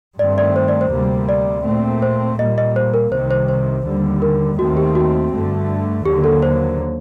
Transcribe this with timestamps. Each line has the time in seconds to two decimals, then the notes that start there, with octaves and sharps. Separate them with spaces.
0.19 G2 D#3 A3 C4 D5
0.38 D5
0.56 C5
0.68 D5
0.81 C5
0.92 D2 C3 G3 A#3
1.29 D5
1.66 A#2 A3 C4
2.02 C5
2.39 A#2 G3 A#3 D#5
2.58 D#5
2.76 C5
2.94 A#4
3.12 C2 C3 D#3 C5
3.31 C5
3.48 C5
3.85 D#2 D3 G3
4.22 A#4
4.59 D#2 D#3 A3 C4 F#4
4.77 G4
4.95 F#4
5.33 G2 D3 A3
6.05 D#2 D3 F#3 A#3 G4
6.24 A4
6.43 C5